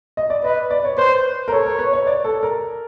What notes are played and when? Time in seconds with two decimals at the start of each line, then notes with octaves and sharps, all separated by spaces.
0.17 D#5
0.30 D5
0.44 B4 D#5
0.70 D5
0.85 C#5
0.98 B4 C5
1.48 A#4
1.52 A4 C#5
1.66 A#4
1.79 B4
1.93 C#5
2.07 D5
2.24 A4
2.43 A#4